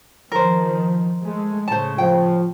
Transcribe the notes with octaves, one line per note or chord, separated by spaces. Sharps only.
D#3 F3 A#4 C5
G#3 A3
A2 C#3 C5 A5
F3 G5